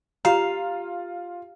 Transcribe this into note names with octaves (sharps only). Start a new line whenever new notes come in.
F4 G4 F5 A#5